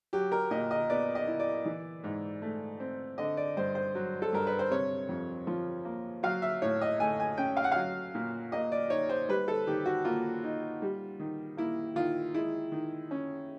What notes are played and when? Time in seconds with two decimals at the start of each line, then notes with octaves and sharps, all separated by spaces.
0.13 F#3 G4
0.32 A#4
0.51 A#2 D#5
0.71 D#5
0.90 B3 D5
1.15 D#5
1.28 E4
1.40 D5
1.65 E3
2.04 G#2
2.42 A3
2.80 C4
3.18 D3 D#5
3.37 D5
3.57 G2 C5
3.75 C5
3.95 F#3
4.22 A4
4.33 G2 A#4
4.47 B4
4.59 C5
4.71 C3 C#5
5.09 F2
5.47 F3
5.85 A#3
6.23 F#3 F5
6.42 E5
6.62 A2 C#5
6.81 D#5
7.00 A3 G#5
7.20 G#5
7.38 C#4 G5
7.57 F5
7.64 F#5
7.72 F#3 F5
8.15 A#2
8.52 A#3 D#5
8.72 D5
8.90 D#4 C#5
9.09 C5
9.29 G3 B4
9.48 A4
9.67 D#3 G4
9.86 F#4
10.05 A#3 F4
10.44 D#4
10.82 G3
11.20 D#3
11.57 A#3 E4
11.96 D#3 F4
12.34 G#3 E4
12.72 D#3
13.11 C#4